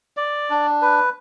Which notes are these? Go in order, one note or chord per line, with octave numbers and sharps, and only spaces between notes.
D5
D4
B4